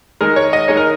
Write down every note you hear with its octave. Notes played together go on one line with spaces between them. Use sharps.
D#3 G#3 D#4 A#4
C#5
D#5
D#3 G#3 D#4 C#5
A#4